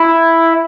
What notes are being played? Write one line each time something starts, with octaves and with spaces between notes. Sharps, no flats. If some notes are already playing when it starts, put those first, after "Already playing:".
Already playing: E4